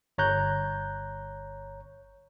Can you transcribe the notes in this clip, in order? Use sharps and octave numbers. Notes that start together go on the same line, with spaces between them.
G1 C#5 A#5 F#6 G6